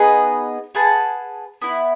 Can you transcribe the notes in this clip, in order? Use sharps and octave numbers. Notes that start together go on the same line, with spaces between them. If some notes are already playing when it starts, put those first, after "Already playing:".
Already playing: B3 D#4 G#4 B4
G#4 B4 F#5 A5
B3 E4 B4